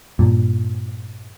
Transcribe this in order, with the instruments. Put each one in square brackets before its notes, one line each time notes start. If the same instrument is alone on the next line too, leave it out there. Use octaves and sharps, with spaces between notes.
[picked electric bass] G2 A#2